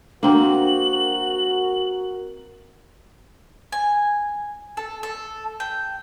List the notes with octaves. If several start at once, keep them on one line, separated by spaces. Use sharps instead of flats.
A#3 C4 D4 F#4 A#4 F#7
G#5
A4
A4
G5